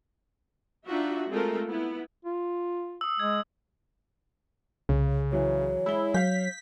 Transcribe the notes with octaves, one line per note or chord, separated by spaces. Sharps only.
D4 D#4 F4 F#4 E5
G#3 A3 C4 F4 A4 A#4
B3 E4
F4
D#6 E6
G#3 G#6
C2 C#3
E3 F#3 E4 C#5
G#3 E4 G7
F#3 F5 G6 B6